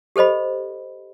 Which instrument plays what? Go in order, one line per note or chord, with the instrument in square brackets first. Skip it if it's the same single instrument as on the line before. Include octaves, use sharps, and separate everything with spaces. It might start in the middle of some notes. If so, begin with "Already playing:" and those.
[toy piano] G4 A4 C5 D#5 B5